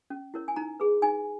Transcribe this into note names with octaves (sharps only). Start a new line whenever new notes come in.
C#4
E4 A#4 C#5
G#5
D#4 A#5
G#4 B4
D#4 G#5